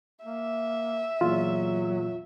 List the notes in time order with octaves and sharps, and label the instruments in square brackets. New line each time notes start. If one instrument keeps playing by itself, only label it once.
[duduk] A#3 [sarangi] E5
[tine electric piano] E2 A#2 [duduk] F#3 [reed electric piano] F4